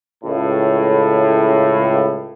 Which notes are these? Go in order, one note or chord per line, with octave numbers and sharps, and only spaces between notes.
C#2 A2